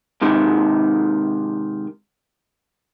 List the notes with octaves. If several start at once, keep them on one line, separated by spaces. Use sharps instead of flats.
G#2 C3 D#3